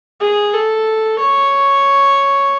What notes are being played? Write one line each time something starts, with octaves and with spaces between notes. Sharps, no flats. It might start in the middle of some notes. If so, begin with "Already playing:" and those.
G#4
A4
C#5